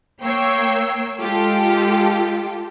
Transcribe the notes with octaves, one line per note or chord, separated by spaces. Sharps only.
A#3 C#5 G5 E6 C7
G#3 F4 G4 A4